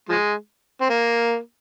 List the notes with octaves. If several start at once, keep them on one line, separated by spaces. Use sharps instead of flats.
F3 G#3
C4
A#3